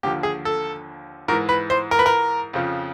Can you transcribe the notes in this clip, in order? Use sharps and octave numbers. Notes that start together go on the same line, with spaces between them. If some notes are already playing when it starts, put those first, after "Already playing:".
D#2 D3 F3 G4
G#4
A4
G#2 E3 A#4
B4
C5
A#4
B4
A#4
F2 C#3 F3